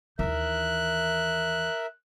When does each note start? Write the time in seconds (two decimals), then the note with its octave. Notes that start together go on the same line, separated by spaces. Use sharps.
0.19 D#2 E3 A#4 E5 F#6